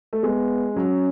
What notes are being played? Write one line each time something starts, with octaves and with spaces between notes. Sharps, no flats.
A3
G#3 B3
F#3 C#4